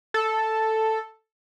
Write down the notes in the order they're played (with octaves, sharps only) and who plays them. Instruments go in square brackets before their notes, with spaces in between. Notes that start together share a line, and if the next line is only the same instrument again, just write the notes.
[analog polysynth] A4